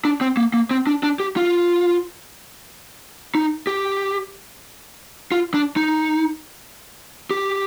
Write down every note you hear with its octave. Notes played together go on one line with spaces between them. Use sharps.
D4
C4
A#3
A#3
C4
D4
D4
G4
F4
D#4
G4
F4
D4
D#4
G4